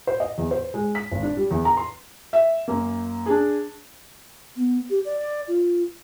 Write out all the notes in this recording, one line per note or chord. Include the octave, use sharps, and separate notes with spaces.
C5
D#5
E2
C5
G#3
B6
G#1
D4
G3
E2
A#5
C6
E5
F#2 A#3
D4 G#4
B3
G4
D5
F4